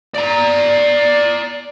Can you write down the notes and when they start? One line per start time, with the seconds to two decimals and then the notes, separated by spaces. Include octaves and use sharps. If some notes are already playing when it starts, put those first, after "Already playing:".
0.14 D5 A#5